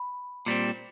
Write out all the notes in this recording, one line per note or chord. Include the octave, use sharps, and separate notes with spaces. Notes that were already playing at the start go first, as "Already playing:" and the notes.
Already playing: B5
A#2 G3 C4